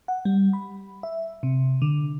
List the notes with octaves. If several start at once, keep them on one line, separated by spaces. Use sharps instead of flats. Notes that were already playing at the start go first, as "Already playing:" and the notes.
F#5
G3
B5
E5
C3
D3